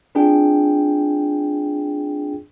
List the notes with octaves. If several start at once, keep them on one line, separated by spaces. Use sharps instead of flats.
C4 D4 F4 G#4 G5